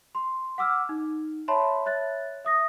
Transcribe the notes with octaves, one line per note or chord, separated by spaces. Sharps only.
C6
F#5 D6 E6 F6
D#4
C#5 E5 A5 B5 C6
C#5 E5 F#6 A6
E5 D#6 A#6